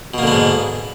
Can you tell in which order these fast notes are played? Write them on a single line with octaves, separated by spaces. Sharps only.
B2 A#3 D3 B3 G#2